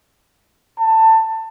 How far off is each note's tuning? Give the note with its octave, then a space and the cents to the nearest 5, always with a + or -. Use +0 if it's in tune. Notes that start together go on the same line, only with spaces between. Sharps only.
A5 +20